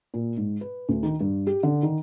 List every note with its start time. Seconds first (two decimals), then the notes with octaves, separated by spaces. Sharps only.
0.14 A#2
0.37 G#2
0.61 B4
0.89 D2
1.03 D#3
1.21 G2
1.47 G4
1.63 D3
1.83 D#3